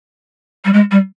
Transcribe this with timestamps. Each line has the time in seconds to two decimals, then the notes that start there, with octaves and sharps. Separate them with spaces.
0.65 G3
0.73 G#3
0.91 G3